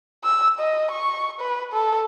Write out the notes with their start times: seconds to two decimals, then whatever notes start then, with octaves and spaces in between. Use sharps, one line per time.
0.24 E6
0.60 D#5
0.91 C#6
1.40 B4
1.72 A4